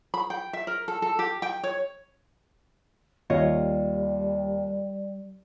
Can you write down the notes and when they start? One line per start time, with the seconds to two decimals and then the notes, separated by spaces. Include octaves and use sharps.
0.14 B5
0.30 G5
0.53 E5
0.67 A#4
0.88 A4
1.02 A4
1.19 G4
1.42 G5
1.63 C#5
3.30 D#2 G3 F4 C#5 D#5